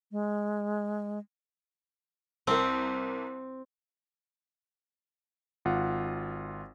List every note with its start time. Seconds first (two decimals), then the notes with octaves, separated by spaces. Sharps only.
0.12 G#3
2.47 C2 C4 A#4
5.65 G#1 F4 F#5